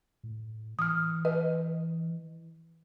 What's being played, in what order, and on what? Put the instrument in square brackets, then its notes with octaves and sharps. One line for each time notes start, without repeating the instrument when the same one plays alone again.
[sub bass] A2
[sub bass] E3 [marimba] D#6 F6
[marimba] B4 D#5